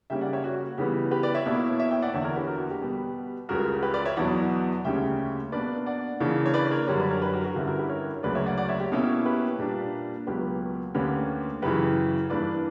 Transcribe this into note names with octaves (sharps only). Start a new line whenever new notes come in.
C#3 G3 A#3 C#4 E5 G5
D5 F#5
C#5 E5
F#4
C#3 E3 G3 B3 G4
G4 B4
B4 D5
C#5 E5
B2 A#3 E4
C#5 E5
E5 G5
D5 F#5
E2 D3 A#3 C#5 E5
A#4 C#5
G4 B4
F#4 A#4
F#4
G4
B2 G3 B3
C#2 C#3 G3 F#4 A#4
G4 B4
B4 D5
C#5 E5
E2 B2 F#3 D5 F#5
D2 C#3 G3 A#3 C#4 E5 G5
B2 A#3 D4 B4 D5
D5 F#5
C#3 E3 A#3 D4
C#5
B4 D5
A#4 C#5
F#2 D3 G3 A#4 C#5
B4 D5
A#4 C#5
G4 B4
F#4 A#4
F#4 A#4
G2 D3 G3 C#4 E4 G4
F#4 A#4
G4 B4
A#4 C#5
D2 C#3 F#3 A#3 B4 D5
C#5 E5
D5 F#5
D5 F#5
C#5 E5
G4
B2 A#3 C#4 E4
G4 B4
A#2 G3 A#3 D4
C#2 B2 F#3 A#3 G4 B4
D2 D3 A#3 C#4 G4 B4
F#2 C#3 E3 G4 B4
G2 E3 A#3 D4 B4 D5